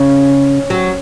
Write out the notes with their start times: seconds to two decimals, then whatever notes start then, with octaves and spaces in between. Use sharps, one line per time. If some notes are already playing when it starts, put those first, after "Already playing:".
Already playing: C#3 C#4
0.70 F#3